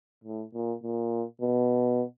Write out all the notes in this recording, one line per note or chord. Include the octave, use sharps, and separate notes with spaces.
A2
A#2
A#2
B2